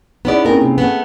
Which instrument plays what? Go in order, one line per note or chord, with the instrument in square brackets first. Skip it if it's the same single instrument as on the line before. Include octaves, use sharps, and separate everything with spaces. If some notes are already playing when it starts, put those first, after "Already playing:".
[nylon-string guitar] B3 C#4 D5 [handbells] D#4 E4 G#4
[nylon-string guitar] A3 A#4 [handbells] A#3 C4 C#4
[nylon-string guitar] C3 [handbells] G#4
[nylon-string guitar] A3 B3